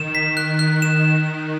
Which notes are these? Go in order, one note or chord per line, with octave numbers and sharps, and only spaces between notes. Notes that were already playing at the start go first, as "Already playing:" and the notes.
Already playing: D#3 E7
B6
F#6
F#6
E7